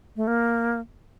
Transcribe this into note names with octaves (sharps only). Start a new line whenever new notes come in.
A3
A#3